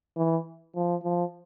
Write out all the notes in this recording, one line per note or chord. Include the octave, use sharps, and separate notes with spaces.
E3
F3
F3